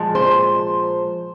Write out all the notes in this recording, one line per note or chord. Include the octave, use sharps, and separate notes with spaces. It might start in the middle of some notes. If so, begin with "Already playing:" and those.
Already playing: A#2 F3 G#3
C5